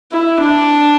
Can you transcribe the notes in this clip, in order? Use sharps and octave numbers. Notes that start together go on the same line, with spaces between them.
E4
D4